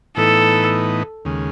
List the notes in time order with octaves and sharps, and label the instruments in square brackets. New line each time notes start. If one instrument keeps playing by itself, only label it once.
[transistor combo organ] A2 E3 B3 D#4 [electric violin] A4
[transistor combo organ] D#2 C#3 G#3